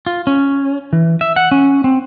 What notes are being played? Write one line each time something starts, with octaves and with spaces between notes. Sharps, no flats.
F4
C#4
E3
E5
F#5
C#4
C4